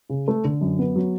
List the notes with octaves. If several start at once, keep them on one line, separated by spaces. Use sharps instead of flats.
C#3
A3
D3
F#2
B3
F#3